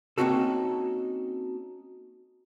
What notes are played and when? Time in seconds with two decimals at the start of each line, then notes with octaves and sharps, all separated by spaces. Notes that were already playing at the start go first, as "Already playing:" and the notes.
0.18 A#3 C4 C#4 D#4 F#4 A4